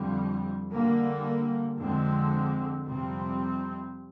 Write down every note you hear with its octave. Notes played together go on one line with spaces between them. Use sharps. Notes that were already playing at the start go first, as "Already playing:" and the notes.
Already playing: F2 D3 G3
D3 G3 A#3
F2 D3 G#3 C4
F2 C3 G3 C4